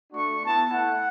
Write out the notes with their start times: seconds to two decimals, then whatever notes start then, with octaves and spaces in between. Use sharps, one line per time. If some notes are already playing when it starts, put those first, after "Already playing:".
0.13 A3 D4 F#4 C#6
0.41 B3 E4 A5
0.70 A3 E4 F#5